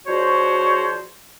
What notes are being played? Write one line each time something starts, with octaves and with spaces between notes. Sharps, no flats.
F3 D4 F#4 G#4 C5 C#5